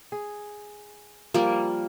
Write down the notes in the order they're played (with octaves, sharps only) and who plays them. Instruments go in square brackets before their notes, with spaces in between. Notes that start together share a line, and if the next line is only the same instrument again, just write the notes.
[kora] G#4
[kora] F3 [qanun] G3 A#3